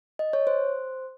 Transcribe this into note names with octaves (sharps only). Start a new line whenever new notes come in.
D#5
C#5
C5